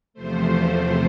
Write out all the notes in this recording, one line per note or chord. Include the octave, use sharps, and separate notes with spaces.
E2 C3 F3 A3 C5